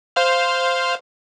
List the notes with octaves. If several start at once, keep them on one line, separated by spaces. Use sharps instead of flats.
C5 F5 F6